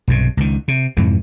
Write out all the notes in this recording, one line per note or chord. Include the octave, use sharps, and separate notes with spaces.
B1 G2 C3
C#2 D#3
C3
F2 G#2 C3 E3